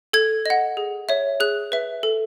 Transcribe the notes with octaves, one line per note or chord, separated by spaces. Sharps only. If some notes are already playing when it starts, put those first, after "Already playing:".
A4 G#6
D#5 F#5
G#4
C#5 E5
G#4 F#6
B4 E5
A4